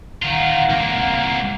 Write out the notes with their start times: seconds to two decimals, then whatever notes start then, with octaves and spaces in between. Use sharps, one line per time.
0.22 D#3 F4 F5 F#5 A#5
0.70 C2 A#3